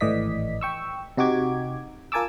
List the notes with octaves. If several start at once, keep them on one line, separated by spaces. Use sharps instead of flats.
G#1 A2 E3 D5 D#5 B6
G5 C#6 E6
C3 D#4 F#4 G4 D6 G#6
F4 A#4 G#5 A5 D6 E6